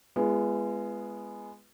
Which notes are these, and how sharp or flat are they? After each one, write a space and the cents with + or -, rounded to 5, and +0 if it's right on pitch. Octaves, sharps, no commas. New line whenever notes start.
G#3 +0 B3 +0 F4 -40